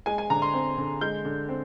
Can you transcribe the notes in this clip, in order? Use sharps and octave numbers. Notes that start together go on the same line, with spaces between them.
G#3 G#5
G#5
D3 A#5
C6
C4
D3
G#3 G6
D3
C4